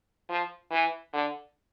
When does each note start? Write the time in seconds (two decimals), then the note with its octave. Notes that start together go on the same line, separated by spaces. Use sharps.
0.29 F3
0.71 E3
1.13 D3